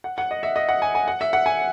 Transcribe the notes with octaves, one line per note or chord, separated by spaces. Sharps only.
F#5
F#5
D#5
E5
D#5
F#5
G#5
G#5
F#5
E5
F#5
G#5